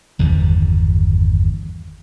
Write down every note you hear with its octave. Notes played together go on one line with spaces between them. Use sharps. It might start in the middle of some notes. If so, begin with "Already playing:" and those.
G1 E2 D#3 G3